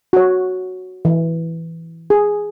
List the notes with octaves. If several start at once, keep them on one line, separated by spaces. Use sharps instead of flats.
F#4 C#5
E3
G#4